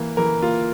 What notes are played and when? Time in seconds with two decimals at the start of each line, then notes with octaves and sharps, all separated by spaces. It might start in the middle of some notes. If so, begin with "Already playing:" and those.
Already playing: E3 A#3
0.17 E3 A#4
0.42 A#3 F4